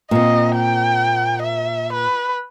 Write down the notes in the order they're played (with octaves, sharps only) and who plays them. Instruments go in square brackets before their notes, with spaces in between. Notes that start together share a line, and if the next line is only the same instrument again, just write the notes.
[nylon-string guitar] A#2 C4 [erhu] D#5
[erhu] G5
E5
B4